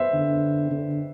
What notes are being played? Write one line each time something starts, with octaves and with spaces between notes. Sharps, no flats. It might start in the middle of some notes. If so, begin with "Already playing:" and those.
Already playing: B4 C5 E5
D3
D3